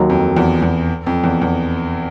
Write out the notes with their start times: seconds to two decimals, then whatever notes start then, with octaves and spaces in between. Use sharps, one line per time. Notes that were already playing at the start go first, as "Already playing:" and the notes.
Already playing: D#2 D#3 F#3 A#3
0.10 F2
0.36 E2
0.62 E2
1.07 F2
1.24 E2
1.42 E2